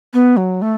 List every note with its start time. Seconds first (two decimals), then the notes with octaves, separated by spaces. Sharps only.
0.13 B3
0.37 F#3
0.62 A3